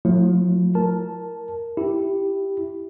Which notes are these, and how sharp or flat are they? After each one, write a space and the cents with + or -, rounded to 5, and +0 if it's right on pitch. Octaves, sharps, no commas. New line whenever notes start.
F3 +45 A3 +0 E4 +0
A#4 +0 A5 -5
E4 +0 G4 +0